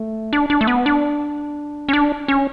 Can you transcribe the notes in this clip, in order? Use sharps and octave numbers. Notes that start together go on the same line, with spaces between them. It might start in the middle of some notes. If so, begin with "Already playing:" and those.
Already playing: A3
D4
D4
A3
B3
D4
C#4
D4
C#4